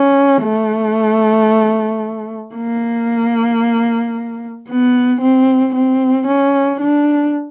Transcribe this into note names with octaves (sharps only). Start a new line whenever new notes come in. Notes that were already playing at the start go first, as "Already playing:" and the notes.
Already playing: C#4
A3
A#3
B3
C4
C4
C#4
D4